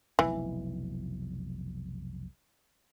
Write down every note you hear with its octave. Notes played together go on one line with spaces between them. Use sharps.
F1 B1 E3